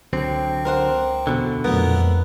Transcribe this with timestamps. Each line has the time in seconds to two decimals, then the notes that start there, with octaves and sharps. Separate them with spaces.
0.13 C#2 D3 F#3 C4 G5
0.65 A#4 C5 F#5
1.27 E2 B2 D3
1.64 F2 A#2 F#3 A3 B3 A#4 F#5